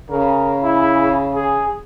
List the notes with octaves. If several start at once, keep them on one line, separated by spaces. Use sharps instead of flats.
C#3 A#4
E4
G#4